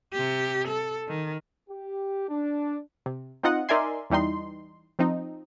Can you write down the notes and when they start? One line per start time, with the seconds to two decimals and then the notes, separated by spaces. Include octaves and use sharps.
0.13 C3 G4
0.68 A4
1.07 D#3
1.70 G4
2.29 D4
3.06 C3
3.43 C4 D#4 F4 D#5 F#5
3.69 D#4 A#4 D5 E5 G#5 C6
4.10 E2 E3 G3 D#4 C6
4.99 F3 C4 D#4